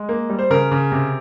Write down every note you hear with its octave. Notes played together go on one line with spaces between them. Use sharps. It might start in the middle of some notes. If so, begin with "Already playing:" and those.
Already playing: G#3
A#3
G3
C5
C#3 A#4
C#3
C3